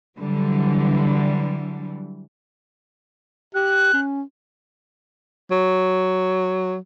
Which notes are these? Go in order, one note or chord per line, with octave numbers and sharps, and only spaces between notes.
D3 E3 F#3 G3
G4 F#6
C#4
F#3